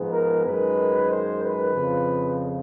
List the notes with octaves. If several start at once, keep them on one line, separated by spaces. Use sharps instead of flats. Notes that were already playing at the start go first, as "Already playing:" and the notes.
Already playing: G#2 F3 G#3 B3
A#4
F#2 D#3 G#3 B4
C5
B4
F2 C#3 F3